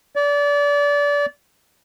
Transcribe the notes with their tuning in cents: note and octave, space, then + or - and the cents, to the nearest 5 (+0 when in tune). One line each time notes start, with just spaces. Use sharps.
D5 -30